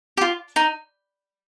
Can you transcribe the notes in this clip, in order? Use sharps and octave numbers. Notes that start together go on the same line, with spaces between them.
G4
F4
D#4